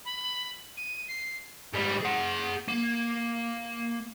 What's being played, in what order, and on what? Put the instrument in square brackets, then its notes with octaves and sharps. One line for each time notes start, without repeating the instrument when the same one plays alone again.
[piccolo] B5
D#7
C7
[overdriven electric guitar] G#2 G3
G#4 F#5
A#3